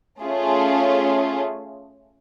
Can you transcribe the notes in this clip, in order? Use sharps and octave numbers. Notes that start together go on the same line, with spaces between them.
A3 C#4 F4 G#4